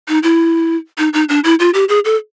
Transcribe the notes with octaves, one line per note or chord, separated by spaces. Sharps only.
D#4
E4
D#4
D#4
D4
E4
F4
G4
G#4
A4